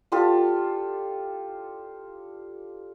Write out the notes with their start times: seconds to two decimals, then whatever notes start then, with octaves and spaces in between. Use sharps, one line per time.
0.12 D4 F4 G4 A4